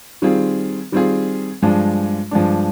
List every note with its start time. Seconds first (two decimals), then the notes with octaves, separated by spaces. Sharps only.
0.22 D#3 G3 C4 F4 G#4
0.92 D#3 G3 C4 F4 G#4
1.62 G2 F3 G#3 D4
2.31 G2 F3 G#3 D4